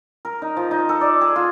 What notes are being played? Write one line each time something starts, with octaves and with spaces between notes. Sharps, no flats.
A#4
D#4
F3
D#4
A4
D5
G#4
F4